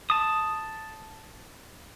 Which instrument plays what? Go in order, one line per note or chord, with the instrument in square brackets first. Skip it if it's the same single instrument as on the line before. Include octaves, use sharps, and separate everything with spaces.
[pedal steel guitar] A5 D#6